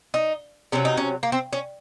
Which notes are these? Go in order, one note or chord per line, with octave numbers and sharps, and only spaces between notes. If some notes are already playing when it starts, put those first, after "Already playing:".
D#4
C3 F#3 C#4
D#4
C#4
A#3
C4
C#4